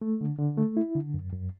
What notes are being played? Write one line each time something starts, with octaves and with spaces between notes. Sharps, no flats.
A3
D3
D3
A3
E4
D3
F#2
F#2